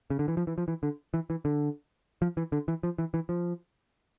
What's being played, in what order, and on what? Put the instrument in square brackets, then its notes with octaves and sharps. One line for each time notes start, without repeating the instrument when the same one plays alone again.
[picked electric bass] C#3
D3
E3
F3
E3
F3
E3
D3
E3
E3
D3
F3
E3
D3
E3
F3
E3
E3
F3